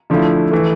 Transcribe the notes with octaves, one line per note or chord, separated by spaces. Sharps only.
D3 F3 A3 E4
E3 A3